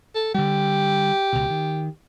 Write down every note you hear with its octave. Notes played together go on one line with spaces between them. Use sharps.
A4
D3 G3 G4
C#2 B2
D#3